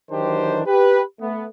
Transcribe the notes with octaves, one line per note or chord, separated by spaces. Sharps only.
D#3 E3 F#3 D4 G4 C5
G4 B4
A3 B3